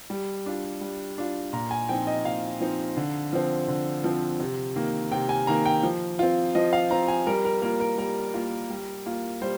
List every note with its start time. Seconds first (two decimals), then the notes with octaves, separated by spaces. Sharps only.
0.10 G3
0.46 D4 F4
0.81 G3
1.18 D4 F4
1.53 A#2 A#5
1.71 G#5
1.89 F3 C4 D#4 G5
2.07 D#5
2.25 A#2 F5
2.60 F3 C4 D#4
2.97 D3
3.33 F3 C4
3.68 D3
4.04 F3 C4
4.40 C3
4.76 D#3 A#3
5.12 C3 G5
5.29 G#5
5.47 D#3 A#3 A#5
5.65 G5
5.83 F3
6.19 C4 F4
6.55 F3 D#5
6.73 F5
6.90 C4 F4 A#5
7.08 G#5
7.27 G3 A#4
7.45 A#4
7.62 A#3 F4 A#4
7.80 A#4
7.98 G3 A#4
8.34 A#3 F4
8.70 G3
9.06 A#3 F4
9.42 G3 C5